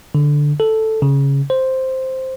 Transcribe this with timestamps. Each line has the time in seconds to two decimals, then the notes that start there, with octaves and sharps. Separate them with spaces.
0.15 D3
0.60 A4
1.02 C#3
1.50 C5